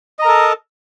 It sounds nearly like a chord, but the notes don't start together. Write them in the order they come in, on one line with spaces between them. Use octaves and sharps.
D#5 A#5 A#4 A4